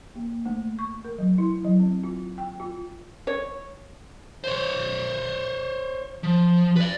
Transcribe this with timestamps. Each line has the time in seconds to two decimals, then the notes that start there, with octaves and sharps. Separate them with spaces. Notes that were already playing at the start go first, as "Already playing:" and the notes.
0.15 A#3
0.45 A3
0.79 C#6
1.05 A#4
1.18 F#3
1.38 E4
1.64 F#3
1.80 C4
2.04 F4
2.38 G5
2.60 F4
3.27 C#5
4.44 C5 C#5
6.23 F3
6.76 B4 D5